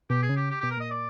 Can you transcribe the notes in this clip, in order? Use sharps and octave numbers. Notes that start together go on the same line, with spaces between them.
B2 G4
G#4
C#3
G4
G4
B2 G4
A#4
A#2 D#5
D5